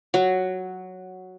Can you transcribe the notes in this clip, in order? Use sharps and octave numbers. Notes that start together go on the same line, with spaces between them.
F#3